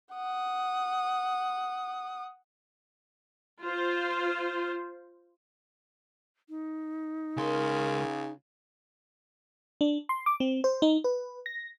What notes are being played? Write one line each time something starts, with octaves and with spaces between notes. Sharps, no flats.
F#5 D#6
F4 C5
D#4
C#2 C#3 A#4 C6
D4
C6
D6
C4
C5
D#4
B4
A#6